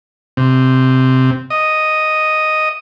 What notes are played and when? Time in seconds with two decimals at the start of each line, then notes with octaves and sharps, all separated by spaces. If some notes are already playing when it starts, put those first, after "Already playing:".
0.37 C3
1.50 D#5